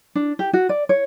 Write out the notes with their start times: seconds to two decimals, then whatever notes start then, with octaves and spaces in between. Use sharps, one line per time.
0.15 D4
0.39 G4
0.53 F#4
0.69 D5
0.89 C#5